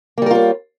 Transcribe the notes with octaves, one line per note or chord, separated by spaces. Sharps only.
G3 A#3 F4 A#4 C#5